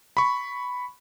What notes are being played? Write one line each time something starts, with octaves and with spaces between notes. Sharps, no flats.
B5 C#6